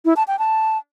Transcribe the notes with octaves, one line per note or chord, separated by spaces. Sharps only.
E4
A5
G5
A5